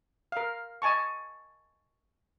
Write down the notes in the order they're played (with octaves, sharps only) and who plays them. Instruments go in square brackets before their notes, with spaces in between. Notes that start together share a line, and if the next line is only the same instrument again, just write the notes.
[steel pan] A#4 F5
D#5 G#5 A5 C#6